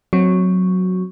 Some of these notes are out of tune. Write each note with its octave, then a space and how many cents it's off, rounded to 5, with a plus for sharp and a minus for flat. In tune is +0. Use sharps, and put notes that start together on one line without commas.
F#3 -5 C4 +0